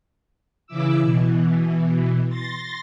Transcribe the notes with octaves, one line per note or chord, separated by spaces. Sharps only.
C#3 E3 E4 D6 E6
B2 E3
C6 A6 A#6